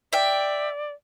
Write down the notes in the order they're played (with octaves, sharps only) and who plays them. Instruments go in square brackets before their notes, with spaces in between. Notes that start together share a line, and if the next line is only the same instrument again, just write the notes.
[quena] D5 [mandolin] E5 G5